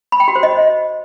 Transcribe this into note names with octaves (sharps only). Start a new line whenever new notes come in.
B5
G5
F#4
C5
D#5